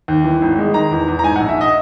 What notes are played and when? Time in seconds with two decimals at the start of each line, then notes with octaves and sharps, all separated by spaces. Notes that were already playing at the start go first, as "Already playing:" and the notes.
0.08 D#2
0.24 E3
0.42 G#1
0.58 G#3
0.74 D#3 A#5
0.91 E2
1.08 E2
1.19 A#5
1.23 G#2 G#5
1.36 A#1 F#5
1.49 E5
1.61 D#5